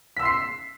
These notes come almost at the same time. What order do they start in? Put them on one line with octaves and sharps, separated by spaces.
B6 E6 C6 C7